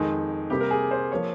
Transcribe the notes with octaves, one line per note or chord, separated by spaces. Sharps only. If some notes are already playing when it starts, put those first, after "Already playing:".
Already playing: F2 D#3 G#3
C3 G3 A#3 G4
A#4
G#4
C5
F3 A#3 C#5